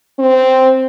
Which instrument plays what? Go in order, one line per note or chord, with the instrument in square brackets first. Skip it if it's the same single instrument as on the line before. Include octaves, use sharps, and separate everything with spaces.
[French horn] C4